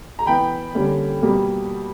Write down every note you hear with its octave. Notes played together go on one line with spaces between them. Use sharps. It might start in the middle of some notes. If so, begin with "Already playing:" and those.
A#5
E3 B3 G5 B5
D3 G3 A#3 C#4
B2 G3 A#3